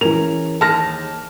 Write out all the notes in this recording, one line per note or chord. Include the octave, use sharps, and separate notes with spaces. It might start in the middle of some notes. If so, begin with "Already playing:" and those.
E3 C#4 G#4 A#4 F7
D#2 D#3 G#4 A5 F6 A#6